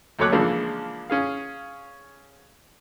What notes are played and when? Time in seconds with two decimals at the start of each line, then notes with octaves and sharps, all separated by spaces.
0.19 D#2 F#3 A3 C#5 D6 F#6
0.32 C#3 E3 F3 G#3 A#3 D4
1.10 C#4 G#4 F5